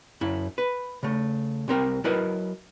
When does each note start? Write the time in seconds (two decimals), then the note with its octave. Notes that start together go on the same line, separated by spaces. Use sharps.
0.21 F#2 E4
0.58 B4
1.03 C#3 A3
1.68 C2 C4 A#4 G5
2.04 F#3 E4 A#4 B4 D#5